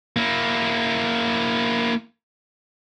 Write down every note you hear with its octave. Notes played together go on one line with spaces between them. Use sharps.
A#3 E4